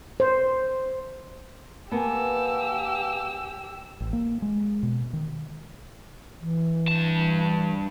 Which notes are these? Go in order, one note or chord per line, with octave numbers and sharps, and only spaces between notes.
C5
A#3 B3 G4 G#5 A5 E6
A1
A#3
G#3
B2
D#3
E3
G2 A5